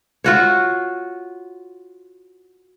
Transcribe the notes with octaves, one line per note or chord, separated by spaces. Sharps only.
F4 F#4 C#5